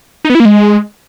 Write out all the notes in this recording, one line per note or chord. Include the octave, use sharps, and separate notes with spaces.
D#4
B3
E4
A#3
G#3